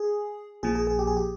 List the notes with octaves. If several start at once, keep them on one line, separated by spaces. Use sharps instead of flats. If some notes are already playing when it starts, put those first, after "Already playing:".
Already playing: G#4
A#1 A#2 F3 G#4
G#4
G#4
G4
G#4
G4